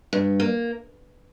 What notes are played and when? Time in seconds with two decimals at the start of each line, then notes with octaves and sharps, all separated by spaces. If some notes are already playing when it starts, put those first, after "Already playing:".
0.13 G2
0.40 A#3